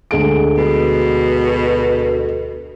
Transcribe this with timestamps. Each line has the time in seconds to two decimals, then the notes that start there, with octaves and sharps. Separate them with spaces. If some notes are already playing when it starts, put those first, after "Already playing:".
0.11 D2 G#3 D7
0.57 B2